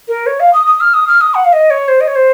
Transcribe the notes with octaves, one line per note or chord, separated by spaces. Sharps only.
A#4
C#5
F5
D#6
D#6
F6
D#6
F6
D#6
F#5
F5
D#5
C#5
C5
D#5
C#5
C5